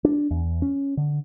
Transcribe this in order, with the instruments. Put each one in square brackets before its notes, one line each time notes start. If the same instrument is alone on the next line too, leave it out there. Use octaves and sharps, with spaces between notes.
[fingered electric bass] D4
E2
C#4
D3